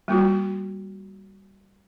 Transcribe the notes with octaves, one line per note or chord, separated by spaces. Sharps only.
G3 A#3 F4 F#4